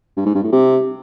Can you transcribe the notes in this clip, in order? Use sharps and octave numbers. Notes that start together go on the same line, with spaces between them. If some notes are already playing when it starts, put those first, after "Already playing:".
G2
G#2
G2
A2
C3